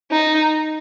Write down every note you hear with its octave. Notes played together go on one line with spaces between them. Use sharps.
D#4